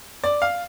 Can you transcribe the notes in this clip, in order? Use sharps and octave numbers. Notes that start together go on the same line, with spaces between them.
D5
F5